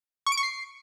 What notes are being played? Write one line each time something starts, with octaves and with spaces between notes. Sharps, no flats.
C#6
D7
C#6
C7